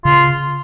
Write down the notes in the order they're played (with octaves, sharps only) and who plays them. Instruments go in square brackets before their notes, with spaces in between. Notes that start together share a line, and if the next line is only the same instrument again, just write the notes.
[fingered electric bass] C#3 [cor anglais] F4